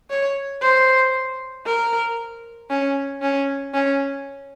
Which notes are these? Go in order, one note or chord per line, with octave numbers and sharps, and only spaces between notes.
C#5
C5
A#4
C#4
C#4
C#4